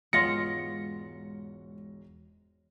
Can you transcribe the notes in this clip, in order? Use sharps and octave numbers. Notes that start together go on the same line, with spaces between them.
E1 G#2 G#3 B3 F4 C#5 A#6 C#7